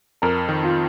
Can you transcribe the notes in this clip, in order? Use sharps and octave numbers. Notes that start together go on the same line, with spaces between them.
F2 A#4
D#3
F4